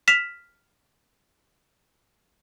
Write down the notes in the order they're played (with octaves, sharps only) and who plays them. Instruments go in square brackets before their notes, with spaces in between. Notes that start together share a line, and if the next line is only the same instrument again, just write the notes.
[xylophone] F6 B6 E7 F7